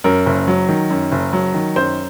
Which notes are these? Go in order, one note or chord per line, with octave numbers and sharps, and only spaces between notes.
F#2 A#4
F#1
F#3
D#3
F#2
F#1
F#3
D#3
F#2 C5